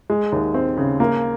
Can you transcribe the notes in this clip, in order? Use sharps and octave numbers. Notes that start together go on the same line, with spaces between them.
G#3
D#2
C4
C#3
A#3